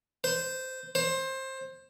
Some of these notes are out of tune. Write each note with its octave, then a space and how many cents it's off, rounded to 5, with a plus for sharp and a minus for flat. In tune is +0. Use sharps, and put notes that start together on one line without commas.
C5 -10
C5 +20